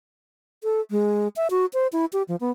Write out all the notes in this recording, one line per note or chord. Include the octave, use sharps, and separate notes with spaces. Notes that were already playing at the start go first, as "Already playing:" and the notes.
A4
G#3
E5
F#4
C5
E4
G4
F3
B3